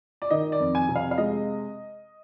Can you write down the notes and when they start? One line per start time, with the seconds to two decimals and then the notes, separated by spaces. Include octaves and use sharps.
0.22 D5
0.30 D#3 D#5
0.52 D5
0.60 F2
0.75 G#5
0.89 C3
0.96 F5
1.11 F5
1.18 G#3 D#5